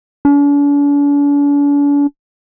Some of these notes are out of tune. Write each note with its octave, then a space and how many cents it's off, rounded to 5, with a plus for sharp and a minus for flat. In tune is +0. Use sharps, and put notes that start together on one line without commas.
D4 -45